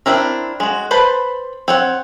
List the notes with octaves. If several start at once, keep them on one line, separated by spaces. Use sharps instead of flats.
C4 D4 E4 A#4
G#3 F#4
B4 C5 A5 B5
C4 C#5 F#5